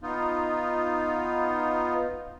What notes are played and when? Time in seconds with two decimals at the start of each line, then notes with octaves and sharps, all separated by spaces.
0.03 B3 D#4 F4